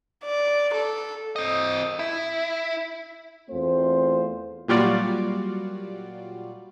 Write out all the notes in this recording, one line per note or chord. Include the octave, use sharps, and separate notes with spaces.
D5
A4
C4 D#5
E4
E2 A3 C4 F4 C5
A#2 F#3 G3 F4 F#4 D5